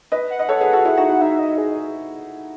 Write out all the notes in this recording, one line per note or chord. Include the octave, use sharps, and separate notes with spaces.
B4 D#5
F#5
D#5
A4 C#5
G#4 B4
F#4 A4
E4 G#4
D#4 F#4
E4
D#4 E5
D#5
G#4